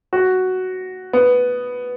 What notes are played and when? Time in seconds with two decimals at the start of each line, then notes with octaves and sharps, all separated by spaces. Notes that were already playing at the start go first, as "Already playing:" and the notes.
0.13 F#4
1.13 B3